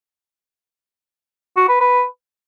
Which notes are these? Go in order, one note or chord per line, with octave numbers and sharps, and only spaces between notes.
F#4
B4
B4